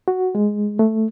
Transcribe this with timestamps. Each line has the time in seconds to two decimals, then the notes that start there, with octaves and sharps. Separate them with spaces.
0.08 F#4
0.35 G#3
0.79 A3